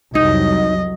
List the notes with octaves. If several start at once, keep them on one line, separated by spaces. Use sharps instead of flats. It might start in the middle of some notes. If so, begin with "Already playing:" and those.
C2 F2 F#3 D#4 D#5